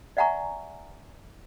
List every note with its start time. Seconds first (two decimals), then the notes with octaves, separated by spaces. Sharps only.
0.17 D5 E5 F#5 G#5 A#5 C#6